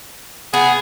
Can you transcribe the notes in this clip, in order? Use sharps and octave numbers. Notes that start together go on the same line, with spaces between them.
B3 G#4